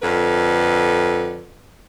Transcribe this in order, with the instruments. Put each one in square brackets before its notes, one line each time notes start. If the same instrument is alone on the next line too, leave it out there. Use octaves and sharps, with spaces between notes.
[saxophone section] F2 D3 B4